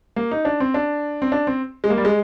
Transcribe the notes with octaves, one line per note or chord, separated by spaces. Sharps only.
A#3
D#4
D4
C4
D4
C4
D4
C4
G#3
A#3
G3
G#3